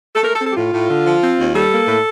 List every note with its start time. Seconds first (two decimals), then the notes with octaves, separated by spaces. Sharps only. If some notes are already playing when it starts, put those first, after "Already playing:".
0.15 A4
0.23 A3 A#4
0.34 A4
0.40 C4
0.45 A4
0.51 G4
0.56 A2 F4
0.72 A2
0.89 D3
1.05 F3
1.22 C4
1.39 D#2
1.55 G3 A4
1.71 A#3
1.88 A2